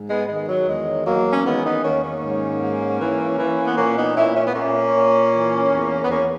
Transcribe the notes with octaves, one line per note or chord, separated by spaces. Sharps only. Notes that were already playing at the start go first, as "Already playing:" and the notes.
Already playing: G#2
G#3 B3
D#3 G#3
F#3
E2 G#3
E2 F#3 A#3
C#4
D#3 G#3 B3
B3 D#4
D#3 A#3 C#4
A#3 C#4
G#2
G#2
E3
E3
B3
A#2 A#3 C#4
B3 D#4
A#2 C#4 E4
C#4
B3
A#2 A#3 C#4
A#2
E3
E2
B3
E2 A#3 C#4